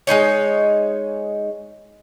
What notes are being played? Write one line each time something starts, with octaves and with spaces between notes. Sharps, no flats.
G#3 A#3 D#4 C#5